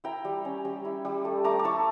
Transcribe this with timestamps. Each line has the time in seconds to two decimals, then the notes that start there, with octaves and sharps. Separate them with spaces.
0.04 E4 G5 A#5
0.25 G3
0.45 C#4
0.65 G3
0.85 E4
1.05 G3
1.25 A3
1.44 A3 A#5 D6
1.59 D6
1.65 E4 A5 C#6